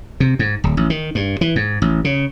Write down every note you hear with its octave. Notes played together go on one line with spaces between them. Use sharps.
C3
G#2
D1
A1
D#3
G2
E3
G#2
A1
C#3